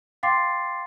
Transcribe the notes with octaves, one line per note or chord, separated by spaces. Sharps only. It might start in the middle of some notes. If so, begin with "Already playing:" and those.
F5 G5 C6 D6 A6 C7